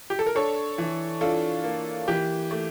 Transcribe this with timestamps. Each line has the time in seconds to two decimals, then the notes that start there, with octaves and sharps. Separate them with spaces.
0.10 G4
0.19 A4
0.26 A#4
0.35 D4 A4 C#5
0.78 E3
1.21 D4 F4 A4
1.64 A#3
2.08 E3 G4
2.51 A3